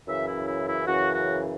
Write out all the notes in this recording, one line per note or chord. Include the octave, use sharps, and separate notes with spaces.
F#2 C#3 E3 E5
E4
E4
E4
F#2 C#3 E3 F#4
F#4